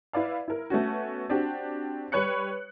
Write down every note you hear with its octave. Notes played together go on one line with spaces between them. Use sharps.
E4 B4 D5 F5
E4 A#4
A3 B3 C#4 F#4
C4 D4 F#4 G4
G3 B4 C#5 F#6 C#7